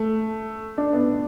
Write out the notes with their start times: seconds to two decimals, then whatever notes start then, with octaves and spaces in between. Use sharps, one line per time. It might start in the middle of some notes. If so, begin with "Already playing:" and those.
Already playing: A3
0.78 D4
0.93 B3